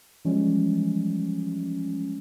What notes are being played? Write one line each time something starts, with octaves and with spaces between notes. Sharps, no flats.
E3 F3 G3 G#3 C#4